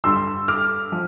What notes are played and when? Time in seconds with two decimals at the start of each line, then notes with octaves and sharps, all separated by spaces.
0.04 G2 D3 G3 C6 E6
0.48 D6 F6
0.92 F3